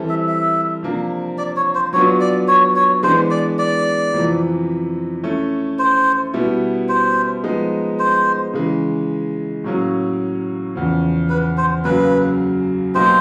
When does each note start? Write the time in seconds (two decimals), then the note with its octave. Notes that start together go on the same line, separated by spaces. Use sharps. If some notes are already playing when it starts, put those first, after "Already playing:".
Already playing: E3 G3 C4 E4 A4
0.09 E5
0.28 E5
0.83 C3 F3 A#3 D4
1.38 D5
1.56 C#5
1.75 C5
1.93 F#3 B3 D4 F4 C#5
2.21 D5
2.48 C#5
2.76 C#5
3.03 E3 G#3 B3 D4 C5
3.31 D5
3.59 D5
4.13 F2 C3 E3
5.24 A3 C#4 E4
5.79 C5
6.34 B2 G3 B3 E4
6.89 C5
7.44 F3 G#3 B3 D#4
7.99 C5
8.54 C#3 E3 G#3
9.64 A2 F#3 A#3 C#4
10.74 E2 C#3 F3
11.30 B4
11.57 C5
11.85 F#2 C#3 F#3 A#3 B4
12.95 B2 F#3 A#3 D#4 G4 C5